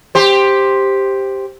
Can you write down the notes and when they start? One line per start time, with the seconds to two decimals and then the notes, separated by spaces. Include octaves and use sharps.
0.15 G4 C5